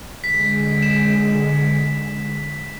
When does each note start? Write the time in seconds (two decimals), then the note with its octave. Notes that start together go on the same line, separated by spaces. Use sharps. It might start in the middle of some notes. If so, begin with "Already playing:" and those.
0.24 D3 G#3 B6
0.83 E7